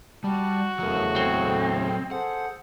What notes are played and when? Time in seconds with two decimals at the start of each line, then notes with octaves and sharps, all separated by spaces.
0.24 G3 F#4 A5
0.79 E2 C#3 F#3 A3 A#4
1.16 F#3 C4 A4 C#5
2.11 G#4 A4 C5 F#5